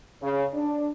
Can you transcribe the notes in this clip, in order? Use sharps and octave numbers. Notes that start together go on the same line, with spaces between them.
C#3
D4